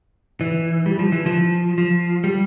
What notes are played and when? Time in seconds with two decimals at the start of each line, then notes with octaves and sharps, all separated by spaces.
0.41 E3
0.86 G3
0.99 F3
1.12 E3
1.26 F3
1.78 F3
2.24 G3